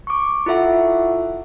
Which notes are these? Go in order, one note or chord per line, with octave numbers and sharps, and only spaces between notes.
C#6 D6
E4 F4 A4 E5 F#5